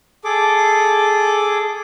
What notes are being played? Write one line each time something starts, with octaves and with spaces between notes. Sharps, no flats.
G#4 A4 D6